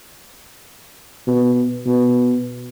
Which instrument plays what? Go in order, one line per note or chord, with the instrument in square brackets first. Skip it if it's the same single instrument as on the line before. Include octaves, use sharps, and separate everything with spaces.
[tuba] B2
B2